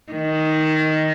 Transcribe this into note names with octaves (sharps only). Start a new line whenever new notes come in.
D#3